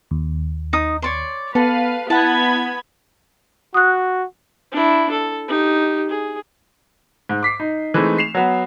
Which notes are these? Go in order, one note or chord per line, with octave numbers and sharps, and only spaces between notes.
D#2
D#4 D#6
C#5 D5 C6
B3 A4 B4 F5
B3 E4 F#5 A5 B5 G#6
F#4 D#6 F#6
D4 E4
A4
D#4 G4
G#4
G#2
D6 B6 C7
D#4
E3 G#3 A3 C4 D#4
C7 E7 F7
F#3 B3